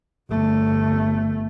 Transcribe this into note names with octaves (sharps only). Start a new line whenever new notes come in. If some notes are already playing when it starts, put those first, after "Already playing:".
G1 A3